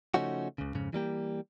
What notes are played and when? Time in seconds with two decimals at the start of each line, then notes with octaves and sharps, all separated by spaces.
0.14 C#3 F3 A3 C#4 D#4 F#4
0.58 C#2 C#3
0.75 F2 G#2 C#3
0.93 E3 G3 A#3 G4